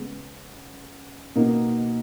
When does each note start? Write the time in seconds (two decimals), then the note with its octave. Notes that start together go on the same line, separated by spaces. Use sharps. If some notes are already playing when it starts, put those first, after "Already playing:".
Already playing: C#3 G#3 B3
1.35 B2 A#3 D#4